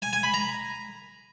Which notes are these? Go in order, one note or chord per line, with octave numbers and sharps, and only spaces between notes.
G#5
G#5
B5
A#5